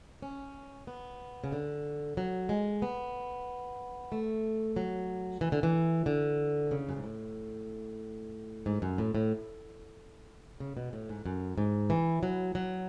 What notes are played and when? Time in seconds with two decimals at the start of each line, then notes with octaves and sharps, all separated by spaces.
0.22 C#4
0.87 B3
1.44 C#3
1.52 D3
2.17 F#3
2.49 G#3
2.82 B3
4.12 A3
4.76 F#3
5.41 E3
5.52 D3
5.63 E3
6.06 D3
6.71 C#3
6.89 F#2
6.96 G#2
7.04 A2
8.66 G#2
8.82 F#2
8.98 A2
9.15 A2
10.60 C#3
10.77 B2
10.93 A2
11.09 G#2
11.25 F#2
11.58 G#2
11.90 E3
12.23 F#3
12.55 F#3